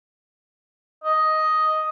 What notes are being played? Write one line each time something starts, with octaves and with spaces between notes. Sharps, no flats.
D#5